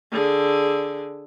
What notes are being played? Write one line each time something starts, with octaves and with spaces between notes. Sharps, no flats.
D3 G#4